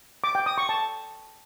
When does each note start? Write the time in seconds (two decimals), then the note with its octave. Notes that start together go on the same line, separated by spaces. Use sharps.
0.24 D6
0.35 G5
0.46 D#6
0.58 C#6
0.69 A5